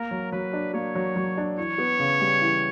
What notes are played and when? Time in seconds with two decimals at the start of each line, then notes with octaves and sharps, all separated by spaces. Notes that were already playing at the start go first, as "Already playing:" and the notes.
Already playing: A#3 A#4
0.11 F#3
0.32 F#3 B4
0.53 D4
0.74 A#3 C#5
0.95 F#3
1.16 F#3
1.37 D4
1.58 E3 C#5
1.78 B3
1.99 C#3
2.21 G3
2.42 E3